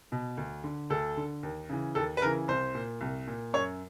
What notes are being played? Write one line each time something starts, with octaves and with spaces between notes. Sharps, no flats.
B2
D2
D3
D2 A4
D3
D#2
C#3 E3
D#2 A4
B4
C#3 E3 A#4
C2 C5
A#2
C2
A#2
F#2 C#5